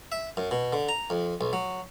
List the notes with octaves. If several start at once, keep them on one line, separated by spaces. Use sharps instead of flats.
E5
F#2
B2
D3
A#5
F2
B1
F#3